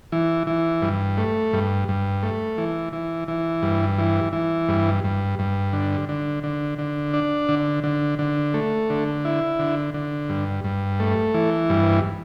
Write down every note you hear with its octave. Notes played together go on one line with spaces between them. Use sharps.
E3
E3
G2
A3
G2
G2
A3
E3
E3
E3
G2
E3
E3
G2
G2
G2
D3
D3
D3
D3
D4
D3
D3
D3
A3
D3
E4
D3
D3
G2
G2
A3
E3
G2